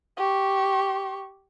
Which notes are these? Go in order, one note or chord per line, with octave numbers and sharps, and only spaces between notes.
G4 C#6